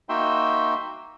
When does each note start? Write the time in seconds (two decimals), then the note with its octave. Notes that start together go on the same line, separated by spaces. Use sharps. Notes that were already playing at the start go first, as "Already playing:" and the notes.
0.09 A#3 D#4 F#4 E5 G5 C6